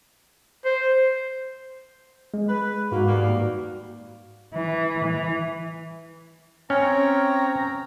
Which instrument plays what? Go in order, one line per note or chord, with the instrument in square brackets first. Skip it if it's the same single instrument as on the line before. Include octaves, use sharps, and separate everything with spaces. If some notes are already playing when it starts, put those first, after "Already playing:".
[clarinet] C5
[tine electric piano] G#3
[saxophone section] B4
[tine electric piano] G#2 F#4 [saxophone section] A#3
[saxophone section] D#2 G3 A#3
[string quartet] E3
E3
[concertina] C4 C#5 G5 [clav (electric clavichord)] C#4 [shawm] A#5 [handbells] F6